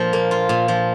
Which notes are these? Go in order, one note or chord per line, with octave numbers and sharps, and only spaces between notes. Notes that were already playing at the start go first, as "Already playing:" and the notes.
Already playing: A#2 F3
A#3
F4
A#2
F3